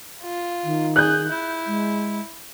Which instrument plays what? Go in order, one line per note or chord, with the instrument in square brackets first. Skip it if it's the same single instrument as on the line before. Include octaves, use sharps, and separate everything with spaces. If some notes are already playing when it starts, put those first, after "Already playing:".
[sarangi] F4
[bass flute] D#3
[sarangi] G#4 [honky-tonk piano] F#6 G6
[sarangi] E4
[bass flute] G#3